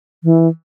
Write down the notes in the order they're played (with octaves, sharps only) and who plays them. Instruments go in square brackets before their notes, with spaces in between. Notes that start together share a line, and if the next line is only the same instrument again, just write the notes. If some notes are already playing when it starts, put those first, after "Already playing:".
[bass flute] E3